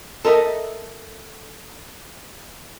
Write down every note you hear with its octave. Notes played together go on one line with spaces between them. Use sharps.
A4 A#4 D#5 E5